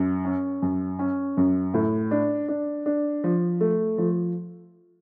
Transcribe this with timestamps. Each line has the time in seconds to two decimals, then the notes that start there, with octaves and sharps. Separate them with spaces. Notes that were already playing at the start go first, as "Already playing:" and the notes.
Already playing: F#2
0.25 C#4
0.62 F#2
0.99 C#4
1.37 F#2
1.74 A2
2.11 D4
2.48 D4
2.86 D4
3.24 F3
3.61 A3
3.98 F3